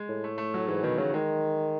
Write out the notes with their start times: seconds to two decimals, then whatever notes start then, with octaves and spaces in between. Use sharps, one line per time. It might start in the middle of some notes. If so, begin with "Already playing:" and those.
Already playing: G#3
0.09 A2
0.24 A3
0.38 A3
0.54 F#3
0.68 G#2 E3
0.83 B2 D#3
0.98 C#3 F#3
1.14 D#3 G#3